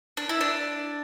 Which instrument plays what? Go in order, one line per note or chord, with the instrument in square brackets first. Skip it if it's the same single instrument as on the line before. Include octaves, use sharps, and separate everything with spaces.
[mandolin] D4
E4
D4